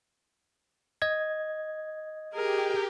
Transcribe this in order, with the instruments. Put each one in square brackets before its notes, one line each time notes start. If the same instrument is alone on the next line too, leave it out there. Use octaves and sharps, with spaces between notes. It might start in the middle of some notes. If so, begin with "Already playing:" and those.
[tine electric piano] D#5 G#6
[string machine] G4 [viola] G#4 A#4